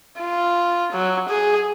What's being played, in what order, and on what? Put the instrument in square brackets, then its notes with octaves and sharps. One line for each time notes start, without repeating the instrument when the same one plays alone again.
[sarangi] F4
F#3
G#4